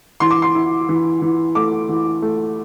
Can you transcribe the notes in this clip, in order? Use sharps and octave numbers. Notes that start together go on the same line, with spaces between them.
E3 C6
D6
C6
E4
E3
E3
A3 D6
E3
A3